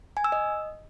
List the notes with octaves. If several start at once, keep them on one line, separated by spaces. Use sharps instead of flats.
G#5
E6
D#5